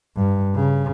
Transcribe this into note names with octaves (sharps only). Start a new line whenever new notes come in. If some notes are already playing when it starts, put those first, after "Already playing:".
G2
C#3